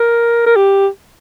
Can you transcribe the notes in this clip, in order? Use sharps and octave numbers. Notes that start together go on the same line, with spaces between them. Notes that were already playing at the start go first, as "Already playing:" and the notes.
Already playing: A#4
A#4
G4